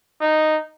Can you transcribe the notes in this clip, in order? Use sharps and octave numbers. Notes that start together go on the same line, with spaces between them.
D#4